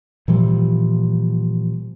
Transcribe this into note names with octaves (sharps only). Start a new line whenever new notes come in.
A#2 E3 F3 G3